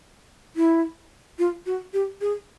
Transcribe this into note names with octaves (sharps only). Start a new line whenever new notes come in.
E4
F4
F#4
G4
G#4